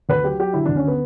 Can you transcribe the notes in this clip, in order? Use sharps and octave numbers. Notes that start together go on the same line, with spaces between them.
D2 B4
F#3 G4
F#3 G4
D3 E4
D2 D4
C#4
D3 B3